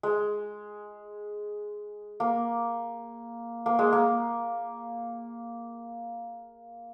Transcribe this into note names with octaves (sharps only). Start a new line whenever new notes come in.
G#3
A#3
A#3
G#3
A#3